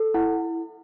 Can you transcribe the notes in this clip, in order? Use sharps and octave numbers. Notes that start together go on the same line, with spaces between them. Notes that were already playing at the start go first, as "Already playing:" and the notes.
Already playing: A4
E4 F#5